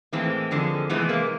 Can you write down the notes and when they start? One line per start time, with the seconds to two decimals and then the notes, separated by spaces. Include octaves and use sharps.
0.12 A2 E3 G#3 A#3 C4
0.51 F2 D3 F3 G#3
0.89 C3 E3 G#3 A3 B3
1.09 A#3